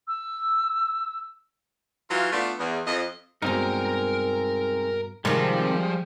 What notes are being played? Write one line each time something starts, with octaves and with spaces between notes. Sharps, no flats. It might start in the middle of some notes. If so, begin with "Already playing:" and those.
E6
E3 F#3 F4
A3 B3 D4 F4
E2
F2 D#5
G2 B2 G#3 C4 D#4 A#4 A#5
C3 D#3 F3 G3 G#3